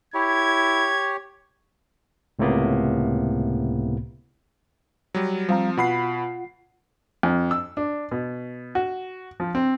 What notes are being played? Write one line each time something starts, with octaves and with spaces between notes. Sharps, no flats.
E4 G4 C#5 G#6
C#2 A2 C3 A#3 B3
F#3 G3
F3 G3 C4 F5 A#5
B2 F4 F#5 B5 C7
F2
E6
D4
B2
F#4
F3
C4